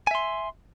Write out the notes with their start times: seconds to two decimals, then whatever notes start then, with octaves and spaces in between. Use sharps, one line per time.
0.07 G#5
0.11 E5
0.15 C6